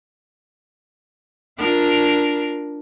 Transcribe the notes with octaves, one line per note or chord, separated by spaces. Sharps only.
D4 F4 A#4